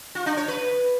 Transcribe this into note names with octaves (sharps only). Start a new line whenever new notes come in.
F4
D4
C#5
B4